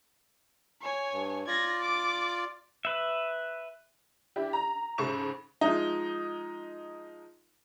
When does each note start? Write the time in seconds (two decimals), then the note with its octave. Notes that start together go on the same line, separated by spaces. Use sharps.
0.82 C#5 G#5
1.13 G2
1.47 F4 D5 G#6 A#6
1.81 D6
2.85 B4 E5
4.36 D4 E4 G4
4.53 A#5
4.98 G#2 C#3 A4 C5 C#6 E7
5.61 F3 G#3 D#4